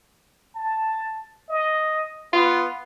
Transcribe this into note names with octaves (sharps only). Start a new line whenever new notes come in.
A5
D#5
B3 F4